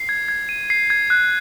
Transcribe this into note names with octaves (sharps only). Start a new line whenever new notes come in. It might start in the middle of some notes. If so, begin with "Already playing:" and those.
Already playing: C7
G#6
G#6
D#7
C7
G#6
F#6